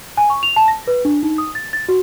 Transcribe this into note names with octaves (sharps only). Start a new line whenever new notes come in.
G#5
C#6
F7
A5
A#6
B4
D4
D#4
D#6
A6
A6
F#4